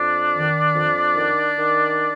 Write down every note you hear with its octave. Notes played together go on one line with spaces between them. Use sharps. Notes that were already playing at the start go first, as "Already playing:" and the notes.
Already playing: F2 D4 D5
D#3
F2
D#3
D#3